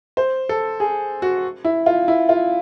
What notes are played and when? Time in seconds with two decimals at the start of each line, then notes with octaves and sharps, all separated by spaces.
0.17 C5
0.49 A4
0.80 G#4
1.22 F#4
1.65 E4
1.86 F4
2.08 E4
2.29 F4